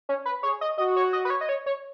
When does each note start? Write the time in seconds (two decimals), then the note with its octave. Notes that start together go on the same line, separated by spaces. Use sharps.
0.09 C#4
0.26 B4
0.43 G#4 C#5
0.61 D#5
0.78 F#4 D#5
0.96 C#5
1.13 D#5
1.25 B4
1.30 C#5
1.41 D#5
1.49 C#5
1.66 C#5